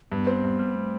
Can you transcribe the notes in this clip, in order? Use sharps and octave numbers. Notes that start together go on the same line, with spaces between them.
G2 B3
C4
G2
G3
A3